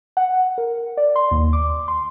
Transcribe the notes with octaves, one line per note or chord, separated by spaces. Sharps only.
F#5
A#4
D5
C6
D#2
D6
C6